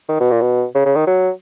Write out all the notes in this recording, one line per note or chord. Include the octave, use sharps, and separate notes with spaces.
D#3
B2
A#2
B2
C#3
C#3
D#3
F#3